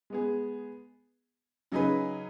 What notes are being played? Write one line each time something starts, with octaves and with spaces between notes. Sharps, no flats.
G#3 B3 G#4
C#3 F#3 D#4 G#4 B4